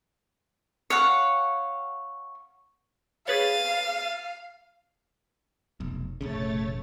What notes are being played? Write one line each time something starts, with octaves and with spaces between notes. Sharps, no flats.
C#5 F5 F#5
G#4 B4 C#5 F5 A6 D#7
F1 B1
F1 A#1 C#3 A3 C#5 A6